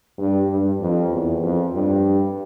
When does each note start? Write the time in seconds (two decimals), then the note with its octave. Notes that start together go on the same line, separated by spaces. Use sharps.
0.18 G2
0.49 G2
0.80 F2
1.11 E2
1.42 F2
1.74 G2